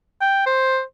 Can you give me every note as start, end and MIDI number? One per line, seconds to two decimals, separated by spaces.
0.21 0.42 79
0.46 0.81 72